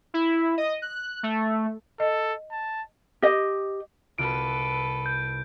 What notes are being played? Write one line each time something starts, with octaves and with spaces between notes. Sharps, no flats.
E4
D#5
F#6
A3
A4 D#5
A5
G4 D#5
C2 F4 F#4 A4 B4 D7
G6